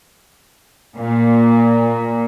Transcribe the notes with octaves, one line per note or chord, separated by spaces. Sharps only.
A#2